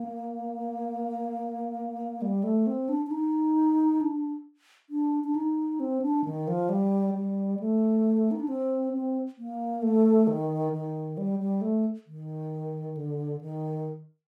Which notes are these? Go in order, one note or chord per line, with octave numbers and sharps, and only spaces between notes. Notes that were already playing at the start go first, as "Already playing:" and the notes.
Already playing: A#3
G3
A3
C4
D4
D4
D#4
D4
D4
D4
D#4
C4
D4
D#3
F3
G3
G3
A3
D#4
D4
C4
C4
A#3
A3
D#3
D#3
G3
G3
A3
D#3
D3
D#3